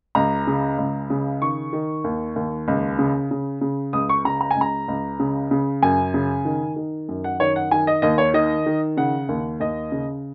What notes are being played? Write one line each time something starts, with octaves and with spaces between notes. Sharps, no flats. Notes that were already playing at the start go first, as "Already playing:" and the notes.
C#2 A#5
C#3
C#2
C#3
D#3 C#6
D#3
D#2
D#2
C#2
C#3
C#3
C#3
C#2 D#6
C#6
C#3 A#5
A#5
G#5
C#2 A#5
C#2
C#3
C#3
F#2 G#5
C#3
D#3
D#3
F#2
F#5
D#3 C#5
F#5
D#3 G#5
D#5
D#2 D#5
C#5
D#3 D#5
D#3
C#3 F#5
D#2
D#2 D#5
C#3